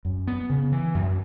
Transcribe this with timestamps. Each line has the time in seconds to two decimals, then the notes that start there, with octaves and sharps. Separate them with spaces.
0.05 F#2
0.27 B3
0.50 C#3
0.72 E3
0.95 F#2